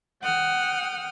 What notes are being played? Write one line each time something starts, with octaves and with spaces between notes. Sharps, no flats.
F#5 G5 D#6 F6